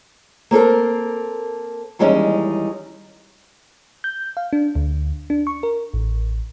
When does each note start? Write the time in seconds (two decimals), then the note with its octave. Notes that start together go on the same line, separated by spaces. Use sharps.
0.51 A#3 C4 A4 A#4
1.99 D#2 E3 G3 G#3 C#4 D#4
4.04 G6
4.37 F5
4.53 D4
4.75 D2
5.30 D4
5.47 C#6
5.63 A#4
5.93 A1